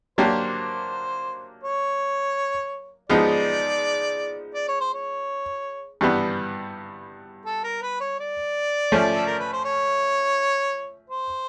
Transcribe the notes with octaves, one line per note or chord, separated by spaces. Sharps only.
F#3 A#3 D4 G4 C5
C#5
F3 G#3 B3 D#4 D5
D5
C#5
C5
C#5
G2 E3 G3 B3
A4
A#4
B4
C#5
D5
F3 A3 C#4
A4
A#4
B4
C5
C#5
C5